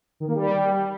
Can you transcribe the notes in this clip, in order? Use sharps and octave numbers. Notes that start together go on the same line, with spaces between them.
D#3
A#3
G3